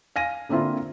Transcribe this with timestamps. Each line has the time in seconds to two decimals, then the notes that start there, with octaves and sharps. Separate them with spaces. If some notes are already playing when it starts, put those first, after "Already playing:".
0.16 F5 G#5 A#6 D#7
0.49 D3 A#3 C4 E4 F4